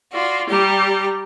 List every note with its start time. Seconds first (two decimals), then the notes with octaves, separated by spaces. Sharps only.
0.14 F4 F#4 D5
0.49 G3 G4 A#5